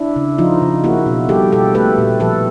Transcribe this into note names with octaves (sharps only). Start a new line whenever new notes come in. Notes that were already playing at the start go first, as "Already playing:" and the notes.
Already playing: D4 E4
C#3
F3 D#4 F4
C#3
A#3 E4 F#4
B2
G3 G4 A4
B2 G4 A4
A3 A4 B4
A#2
F3 A4 B4